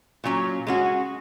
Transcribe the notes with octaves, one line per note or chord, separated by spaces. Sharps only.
A#2 F#3 C#4
G#3 C#4 F#4